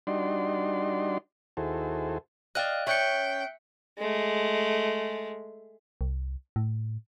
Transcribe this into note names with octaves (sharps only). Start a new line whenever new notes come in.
G3 D4 D#4 F#4 D5 C6
D#2 E4 F#4 G#4 A4 C5
D5 D#5 F5 G5 F#6
C#4 E5 G5 F#6 C#7
G#3 A3
C2
A2